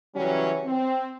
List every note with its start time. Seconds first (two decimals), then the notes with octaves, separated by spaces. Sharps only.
0.15 C#3 E3 F#3 G3 C#4
0.65 C4